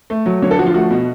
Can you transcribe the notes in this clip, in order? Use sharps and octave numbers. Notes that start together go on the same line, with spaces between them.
A3
F#3
D3 C#5
A4
F3 F#4
F4
A3 F#4
B2